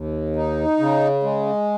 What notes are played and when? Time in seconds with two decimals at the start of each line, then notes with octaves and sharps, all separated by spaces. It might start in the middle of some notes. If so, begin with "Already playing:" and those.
Already playing: D#2
0.36 D#4
0.79 C#3
1.23 G#3